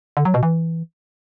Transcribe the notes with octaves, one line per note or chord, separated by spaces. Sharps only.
D3
F#3
B2
E3